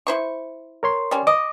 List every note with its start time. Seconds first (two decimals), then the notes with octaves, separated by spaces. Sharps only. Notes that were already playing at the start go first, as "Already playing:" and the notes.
0.07 E4 C5 C#6
0.83 A#4 C#5 C6
1.11 G3 C#4
1.27 D#5 D6